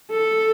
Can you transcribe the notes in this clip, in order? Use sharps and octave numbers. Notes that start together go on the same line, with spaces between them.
A4